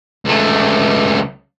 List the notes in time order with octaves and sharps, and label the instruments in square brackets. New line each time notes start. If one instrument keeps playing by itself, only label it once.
[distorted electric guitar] C#2 A3